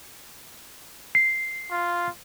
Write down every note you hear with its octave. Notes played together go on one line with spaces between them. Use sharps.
C7
F4